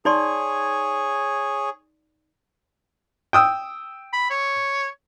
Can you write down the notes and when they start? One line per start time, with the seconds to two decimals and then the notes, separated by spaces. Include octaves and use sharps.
0.05 D#4 G#4 C#5 D5 C6
3.33 G5 D#6 E6
4.13 B5
4.30 C#5